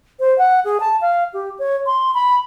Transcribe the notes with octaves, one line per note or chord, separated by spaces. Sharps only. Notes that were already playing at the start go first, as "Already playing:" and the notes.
C5
F#5
G#4
A5
F5
G4
C#5
C6
B5